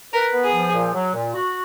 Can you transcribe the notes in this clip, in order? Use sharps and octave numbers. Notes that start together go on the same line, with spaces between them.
A#4 B4
B3
G#4
F3
A#2
F#3
A#2
F#4